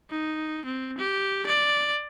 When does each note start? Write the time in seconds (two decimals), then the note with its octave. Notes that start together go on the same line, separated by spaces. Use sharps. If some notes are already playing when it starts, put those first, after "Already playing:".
0.10 D#4
0.65 C4
0.98 G4
1.46 D5